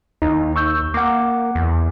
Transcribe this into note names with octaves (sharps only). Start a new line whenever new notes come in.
D#2 D#4
C#6 E6 G6
A#3 F#5 D6
E2